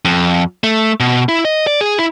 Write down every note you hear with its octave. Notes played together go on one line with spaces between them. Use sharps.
F2
A3
B2
E4
D#5
D5
G#4
E4